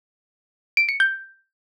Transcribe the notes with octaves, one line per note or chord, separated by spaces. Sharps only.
D7
C#7
G6